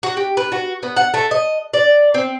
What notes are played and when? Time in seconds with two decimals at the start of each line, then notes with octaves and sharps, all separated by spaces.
0.03 F#4
0.17 G4
0.37 B4
0.52 F#4
0.83 B3
0.97 F#5
1.14 A3
1.31 D#5
1.74 D5
2.14 C4